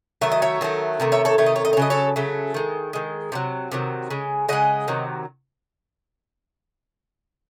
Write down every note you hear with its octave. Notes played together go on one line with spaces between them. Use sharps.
D#3 F#3 A3 E5
D#5
C#5 E5
D#3 F#3 A3
C3 D#3 A3
C#5 E5
A4 C#5
C3 D#3 A3 C#5
D#5
C#5
D#5
C#5
C#3 F#3 A3 D#5
A4 C#5
C#3 F#3 A3
D#3 G#3
D#3 G#3
C3 D#3 F#3
C3 D#3 F#3
C#3 G#3
C#3 G#3 D#5 F#5
C3 D#3 F#3